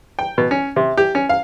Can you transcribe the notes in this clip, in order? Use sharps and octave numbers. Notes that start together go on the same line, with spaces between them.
G5
B2
C#4
C3
G4
C#4
F5